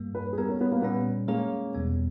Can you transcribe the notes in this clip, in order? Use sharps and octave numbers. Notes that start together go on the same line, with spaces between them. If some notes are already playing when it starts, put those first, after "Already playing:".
Already playing: G2 G3 A#3
B4
G#4
G3 B3 G4 A#4
C#4
B3
A#3
A#2 G3 B3 C#4
G#3 A#3 C#4 G#4 C#5
E2 B2 G3 B3